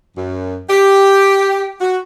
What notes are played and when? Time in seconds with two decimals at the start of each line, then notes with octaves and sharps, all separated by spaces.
0.17 F#2
0.69 G4
1.81 F#4